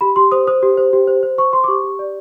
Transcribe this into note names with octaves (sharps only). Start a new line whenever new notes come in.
G4 B5
G4 C6
C5 D#6
C5 D#6
G4
C5
G4
C5
C5
C5 C#6
C5 C6
D6
G4 C#6
G4
D5